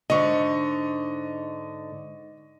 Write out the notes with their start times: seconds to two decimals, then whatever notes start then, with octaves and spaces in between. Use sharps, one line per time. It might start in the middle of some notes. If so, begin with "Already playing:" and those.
0.10 G#2 D3 D#5 C#6